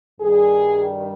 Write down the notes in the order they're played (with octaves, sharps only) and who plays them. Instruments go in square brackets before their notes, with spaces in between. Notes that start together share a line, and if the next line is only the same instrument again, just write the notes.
[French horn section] G2 D#3 G3 G#4
G4